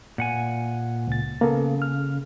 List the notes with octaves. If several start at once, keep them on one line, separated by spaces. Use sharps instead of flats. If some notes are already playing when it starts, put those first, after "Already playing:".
A#2 F#5 G#5
C#2 A6
C#3 A#3 B3 A4
F6